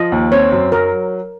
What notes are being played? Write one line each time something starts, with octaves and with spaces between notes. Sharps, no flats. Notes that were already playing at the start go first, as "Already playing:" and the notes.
Already playing: F3 D#5
D#2
C4 C#5
F#2
F#3 A#4